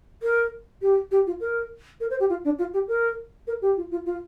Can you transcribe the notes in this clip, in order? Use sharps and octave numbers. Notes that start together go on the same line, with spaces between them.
A#4
G4
G4
F4
A#4
A#4
C5
G4
F4
D4
F4
G4
A#4
A#4
G4
F4
F4
F4